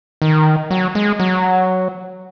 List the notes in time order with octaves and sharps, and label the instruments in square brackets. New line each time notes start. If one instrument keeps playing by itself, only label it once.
[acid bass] D#3
F#3
G#3
F#3